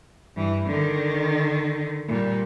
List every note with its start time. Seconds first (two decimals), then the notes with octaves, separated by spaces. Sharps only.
0.36 G2 E3
0.67 D3 D#3
2.08 A#2 G3